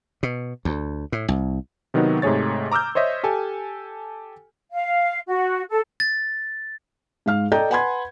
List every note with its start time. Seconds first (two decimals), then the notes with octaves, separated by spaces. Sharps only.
0.23 B2
0.65 D2
1.12 A2
1.28 C2
1.94 C3 D#3 F#3 B3 D#4 F#4
2.22 G#2 C3 A3 G#4 C#5 A6
2.72 A#5 D6 E6 F6 G6
2.95 C5 C#5 D#5 E5
3.23 G4 A4 G#5
4.72 F5
5.27 F#4
5.69 A4
6.00 A6
7.26 G#2 G#3 F5 F6
7.52 A4 D5 D#5 G5 A#5 G6
7.70 B4 F#5 G#5 B5 C6 G#6